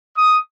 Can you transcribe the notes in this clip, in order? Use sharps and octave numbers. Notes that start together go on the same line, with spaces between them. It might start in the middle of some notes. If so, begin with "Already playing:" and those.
D#6